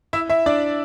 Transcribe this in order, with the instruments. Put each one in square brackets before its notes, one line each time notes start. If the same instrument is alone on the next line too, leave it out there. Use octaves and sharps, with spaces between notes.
[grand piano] E4 E5
E4 E5
D4 D5